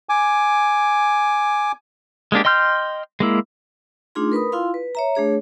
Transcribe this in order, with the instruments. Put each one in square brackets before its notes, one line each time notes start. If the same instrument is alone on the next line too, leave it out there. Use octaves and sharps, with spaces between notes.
[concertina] G#5 D6
[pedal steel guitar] G#3 A#3 D4 G4
D#5 G5 C6 F6 G6
G#3 A#3 E4
[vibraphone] A3 D4 D#4 F4 G#4 C6
A#4 B4 B5 D#6
E4 F4 F5 C6
B4
C#5 E5 A#5
A3 D4 G#4 C#5